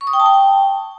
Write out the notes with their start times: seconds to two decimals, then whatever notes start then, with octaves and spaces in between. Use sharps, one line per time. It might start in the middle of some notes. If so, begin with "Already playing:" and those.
0.01 C#6
0.07 D#6
0.13 G5
0.20 A5
0.26 G5